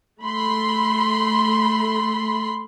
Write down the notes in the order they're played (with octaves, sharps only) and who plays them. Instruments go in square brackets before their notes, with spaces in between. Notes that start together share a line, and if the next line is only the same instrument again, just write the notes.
[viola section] A3 B5 C6